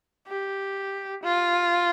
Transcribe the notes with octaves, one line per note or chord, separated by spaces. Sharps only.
G4
F4